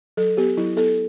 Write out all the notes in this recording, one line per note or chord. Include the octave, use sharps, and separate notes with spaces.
F#3 A4
B3 G4
F#3 E4
B3 A4